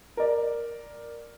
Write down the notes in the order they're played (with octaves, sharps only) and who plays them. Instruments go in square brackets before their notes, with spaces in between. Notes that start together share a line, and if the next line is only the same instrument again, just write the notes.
[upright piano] A#4 D5